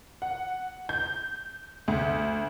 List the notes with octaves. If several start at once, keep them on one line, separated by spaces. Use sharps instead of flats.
F#5
G6
D2